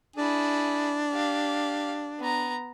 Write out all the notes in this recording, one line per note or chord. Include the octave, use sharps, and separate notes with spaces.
D4 E4 G#4
G4 F5
B3 A#5